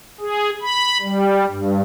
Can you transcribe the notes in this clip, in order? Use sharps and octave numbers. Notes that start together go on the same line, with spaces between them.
G#4
B5
G3
G2